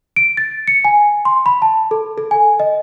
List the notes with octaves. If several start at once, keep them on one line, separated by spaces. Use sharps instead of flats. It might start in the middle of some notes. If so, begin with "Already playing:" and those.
D7
A6
C#7
G#5
C6
B5
A5
A4
A4
G#5
D#5